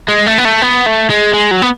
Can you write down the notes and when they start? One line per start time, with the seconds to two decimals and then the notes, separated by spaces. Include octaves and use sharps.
0.08 G#3
0.26 A3
0.38 B3
0.45 A3
0.62 B3
0.86 A3
1.09 G#3
1.33 G#3
1.51 F#3
1.62 B3